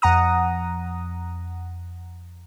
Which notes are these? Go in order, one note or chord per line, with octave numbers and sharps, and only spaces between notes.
F2 F#5 A#5 D#6